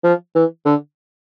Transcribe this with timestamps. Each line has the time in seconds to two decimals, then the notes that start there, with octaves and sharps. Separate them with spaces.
0.04 F3
0.35 E3
0.65 D3